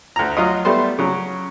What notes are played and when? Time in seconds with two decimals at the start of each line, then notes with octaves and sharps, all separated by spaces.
0.16 D2 A#5
0.37 F#3 F4 D#5
0.65 G3 A3 B3 C5
0.99 C#3 F#3